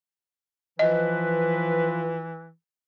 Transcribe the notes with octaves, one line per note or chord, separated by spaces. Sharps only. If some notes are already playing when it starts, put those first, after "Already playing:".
E3 F3 F4 B4 D#5